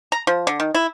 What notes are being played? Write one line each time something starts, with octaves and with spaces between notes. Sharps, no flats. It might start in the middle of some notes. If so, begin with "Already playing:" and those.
A#5
F3
D3
D#3
E4